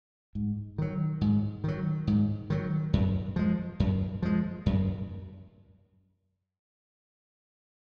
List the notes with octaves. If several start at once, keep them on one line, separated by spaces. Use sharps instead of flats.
G#2
D#3 F#3
G#2
D#3 F#3
G#2
D#3 F#3
F#2
F3 G#3
F#2
F3 G#3
F#2